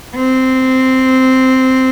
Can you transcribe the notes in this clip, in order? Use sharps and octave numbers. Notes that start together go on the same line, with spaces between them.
C4